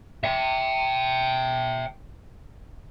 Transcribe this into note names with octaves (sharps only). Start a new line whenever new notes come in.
E5 G5